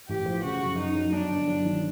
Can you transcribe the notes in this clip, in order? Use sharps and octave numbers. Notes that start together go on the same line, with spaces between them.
A1 G4
F3
C#3 F#4
F#2
F#2 D#4
F#3
G2 D4
G1
F#3
D#3